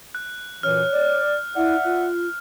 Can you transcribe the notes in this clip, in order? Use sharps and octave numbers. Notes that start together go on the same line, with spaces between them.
F#6
F#2 A#2 E3 C#5 F6
D5
E4 D5 E5 F#5
F4